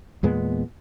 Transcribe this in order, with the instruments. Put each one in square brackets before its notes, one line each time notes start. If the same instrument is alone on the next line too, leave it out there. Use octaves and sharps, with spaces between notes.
[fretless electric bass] E2 A#2 G#3 B3